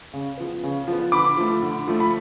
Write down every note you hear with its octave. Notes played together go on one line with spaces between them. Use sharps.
C#3
F3 B3
C#3
F3 B3
D3 B5 D6
F3 A3
D3
F3 A3
B5